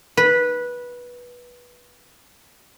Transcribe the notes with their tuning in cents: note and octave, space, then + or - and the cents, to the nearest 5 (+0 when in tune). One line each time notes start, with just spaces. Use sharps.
B4 -15